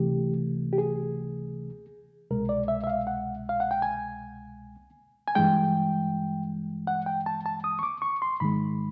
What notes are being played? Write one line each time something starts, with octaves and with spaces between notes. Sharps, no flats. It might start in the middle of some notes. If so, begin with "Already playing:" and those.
Already playing: C#2 C3 E3 A3 G4
G4
G#4
C2 B2 G#3 A#4
D5
E5
E5
F5
F#5
F5
F#5
G5
G#5
G#5
G2 E3 G#3 G5
F#5
G5
A5
A5
D#6
C#6
D6
C#6
C6
G#2 D#3 G#3 B5